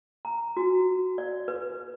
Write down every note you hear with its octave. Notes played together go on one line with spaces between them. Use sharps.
A#5
F#4
D5
B4